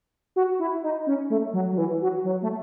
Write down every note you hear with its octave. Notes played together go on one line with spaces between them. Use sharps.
F#4
E4
D#4
C#4
A3
F#3
F#3
E3
F#3
F#3
A3